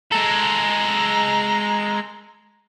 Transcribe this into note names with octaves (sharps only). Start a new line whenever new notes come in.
G#3 A4 A#5